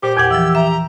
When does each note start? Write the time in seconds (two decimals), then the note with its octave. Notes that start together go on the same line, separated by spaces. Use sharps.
0.03 A#2 G4 C5
0.17 E2 A#2 F#5 G#6
0.31 E3 F3 E6
0.55 E5 A#5